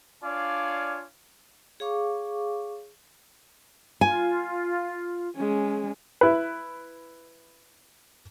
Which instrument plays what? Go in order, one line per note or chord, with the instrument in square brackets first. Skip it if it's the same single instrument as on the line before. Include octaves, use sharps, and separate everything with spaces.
[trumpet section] D4 F4 C#5 D5 F5 G#5
[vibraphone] G#4 C#5 F5 C#6 D6
[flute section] F4 [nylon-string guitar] G#5
[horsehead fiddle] G#3 C#4
[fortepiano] E4 B4